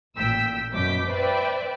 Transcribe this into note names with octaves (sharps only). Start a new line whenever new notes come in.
A1 A#2 G5 E6 B6
F#2 B2 D6 G6 B6
B4 C5 D5 E5 G5